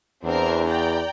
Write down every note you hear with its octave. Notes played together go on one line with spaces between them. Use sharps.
E2 C4 D4 A#4
D5 G5 A#5